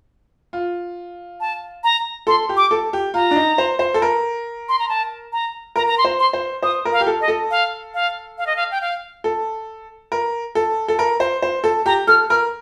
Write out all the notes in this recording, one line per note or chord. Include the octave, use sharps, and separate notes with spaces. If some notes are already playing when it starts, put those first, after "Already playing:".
F4
A5
A#5
A4 C6
G4
D6
A4
G4
F4 A#5
D4
D#4
C5
C5
A4
A#4
C6
A#5
A5
A#5
A#4 A#5
A#5
C6
C5
C6
C5
C5 D#6
A#4
F5
G4
A4
D#5
A4
F5
F5
F5
D#5
F5
G5
F5
A4
A#4
A4
A4
A#4
C5
C5
A4
G4 A#5
A4 F6
A#4 F6